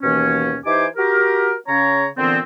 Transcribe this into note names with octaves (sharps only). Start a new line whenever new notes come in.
D#2 B2 E3 A#3 C#4
E3 D#4 G4 C5 G#5 D6
F#4 G4 A#4
C#3 C#4 C#5 A#5
A#2 D3 E3 B3 C4